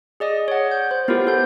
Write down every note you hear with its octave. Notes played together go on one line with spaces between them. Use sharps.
G#4 D5 D#5 D#6
C#5 F#5
G6
C5
B3 E4 F4 G4 A#4 C5
A4 G6